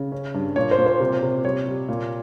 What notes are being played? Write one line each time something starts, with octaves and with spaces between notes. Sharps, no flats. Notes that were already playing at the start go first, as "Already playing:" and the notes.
Already playing: C#3
C#4
G2
A#2 C#5
C5
A#2
C5
C3
C3
G3 C#5
G3
A#2